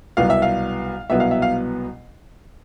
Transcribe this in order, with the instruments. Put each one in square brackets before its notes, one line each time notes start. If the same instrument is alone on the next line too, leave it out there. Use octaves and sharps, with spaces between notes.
[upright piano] C2 B2 F#3 B3 F5
E5
F5
C2 B2 F#3 B3 E5
F5
E5
F5